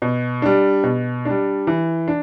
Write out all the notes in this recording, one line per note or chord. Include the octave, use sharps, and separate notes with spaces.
B2
G3 D4
B2
G3 D4
E3
D4